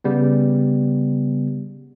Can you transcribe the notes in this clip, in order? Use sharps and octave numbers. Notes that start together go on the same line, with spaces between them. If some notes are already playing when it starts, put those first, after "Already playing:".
C#3 G3 B3